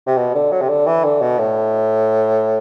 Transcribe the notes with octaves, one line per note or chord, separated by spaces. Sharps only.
C3
B2
D3
F#3
C3
D3
E3
D3
B2
A2